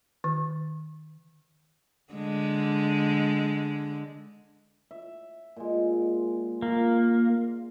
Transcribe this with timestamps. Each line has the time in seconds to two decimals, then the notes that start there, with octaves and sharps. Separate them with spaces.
0.24 D#3
2.13 D3 G#3
4.91 E5
5.56 A#2 G#3
6.62 A#3 F4